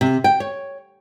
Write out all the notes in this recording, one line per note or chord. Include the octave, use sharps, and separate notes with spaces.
C3
G5
C#5